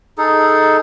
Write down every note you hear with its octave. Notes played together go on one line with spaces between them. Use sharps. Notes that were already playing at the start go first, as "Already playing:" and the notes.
D#4 G#4 A4